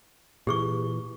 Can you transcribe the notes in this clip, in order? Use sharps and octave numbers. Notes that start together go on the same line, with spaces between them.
A#2 E3 G4 G#4 C#6